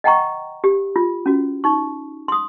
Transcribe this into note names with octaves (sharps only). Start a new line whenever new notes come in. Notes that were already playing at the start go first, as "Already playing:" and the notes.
D#5 F#5 G5 A#5 C#6
G4
F4
C#4 F#4
D#4 C#6
C6 D#6